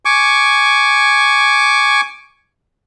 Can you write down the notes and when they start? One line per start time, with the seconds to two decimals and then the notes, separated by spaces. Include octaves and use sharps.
0.05 G#5 C#6 D6